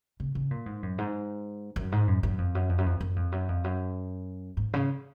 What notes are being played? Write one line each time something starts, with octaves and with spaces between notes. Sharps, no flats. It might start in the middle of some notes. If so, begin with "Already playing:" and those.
C#3
C#3
A#2
G#2
F#2
G#2
F#2
G#2
F#2
F#2
F2
F#2
F2
F#2
F2
F#2
F2
F#2
F2
F#2
G#2
C#3